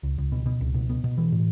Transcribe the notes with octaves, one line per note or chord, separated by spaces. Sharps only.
C#2
C#2
B2
B2
C#2
B2
B3
B2
E3
A2